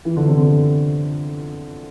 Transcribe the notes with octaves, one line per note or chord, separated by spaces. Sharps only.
E3
D3
C3
D3